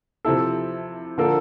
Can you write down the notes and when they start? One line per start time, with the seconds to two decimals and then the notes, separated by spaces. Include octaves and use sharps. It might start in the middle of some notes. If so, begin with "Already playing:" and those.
0.25 C3 F3 C4 E4 A4
1.18 D3 F3 A#3 F4 A4